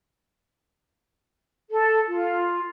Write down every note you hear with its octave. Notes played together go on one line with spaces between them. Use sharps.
A4
F4